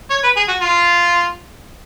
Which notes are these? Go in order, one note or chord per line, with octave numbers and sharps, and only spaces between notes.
C#5
B4
G#4
F#4
F4